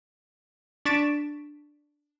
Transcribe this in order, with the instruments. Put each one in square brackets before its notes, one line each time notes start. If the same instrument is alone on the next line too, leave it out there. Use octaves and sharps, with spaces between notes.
[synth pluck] D4 C#6 A6 B6 D7 E7